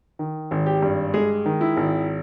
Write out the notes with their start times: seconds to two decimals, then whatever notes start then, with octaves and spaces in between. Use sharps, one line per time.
0.19 D#3
0.51 G#1
0.66 G4
0.82 G2
1.14 G#3 G#4
1.46 D#3
1.61 E4
1.77 G#1